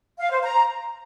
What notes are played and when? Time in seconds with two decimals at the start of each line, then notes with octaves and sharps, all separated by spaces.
0.20 F5
0.31 C5
0.42 A#5